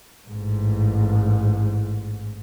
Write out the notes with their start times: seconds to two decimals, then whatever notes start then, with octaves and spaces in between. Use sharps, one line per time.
0.28 A1 G#2